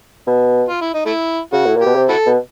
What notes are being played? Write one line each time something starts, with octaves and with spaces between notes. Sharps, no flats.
B2
F4
E4
D#4
A3 E4
C#3 F#4
A2
A#2
B2 G4
C3
E4 F#4 A4
B2